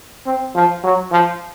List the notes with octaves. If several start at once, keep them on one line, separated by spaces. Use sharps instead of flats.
C4
F3
F#3
F3